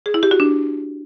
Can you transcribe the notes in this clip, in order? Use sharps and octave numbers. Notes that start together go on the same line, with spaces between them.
G#4
E4
G4
F#4
D4